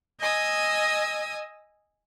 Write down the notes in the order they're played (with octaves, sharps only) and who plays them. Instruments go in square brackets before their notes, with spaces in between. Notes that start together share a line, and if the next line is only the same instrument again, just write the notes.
[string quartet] D#5 G#5 D#6 E6